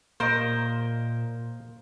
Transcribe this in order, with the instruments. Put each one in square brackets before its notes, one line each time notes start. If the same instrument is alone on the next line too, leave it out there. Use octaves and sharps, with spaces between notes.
[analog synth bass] A#2 [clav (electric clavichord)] A#3 D#5 [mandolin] A#4 C5